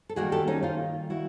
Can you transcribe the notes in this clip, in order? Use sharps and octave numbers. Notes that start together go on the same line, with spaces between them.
A4
D#3 G3 A#3 F#4 G#4
G4 A4
C#4 D#4
D#4 F4
E4 F#4